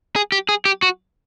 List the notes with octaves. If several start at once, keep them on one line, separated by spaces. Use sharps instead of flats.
G#4
G4
G#4
G4
F#4